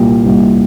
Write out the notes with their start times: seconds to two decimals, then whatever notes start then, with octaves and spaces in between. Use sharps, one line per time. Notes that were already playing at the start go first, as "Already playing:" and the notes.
Already playing: C2 A#2 G4
0.25 C2 A#2